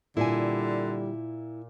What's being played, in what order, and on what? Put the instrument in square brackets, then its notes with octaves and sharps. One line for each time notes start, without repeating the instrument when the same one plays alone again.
[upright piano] A#2 [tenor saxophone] D3 [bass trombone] G3 [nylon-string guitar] E4 G#5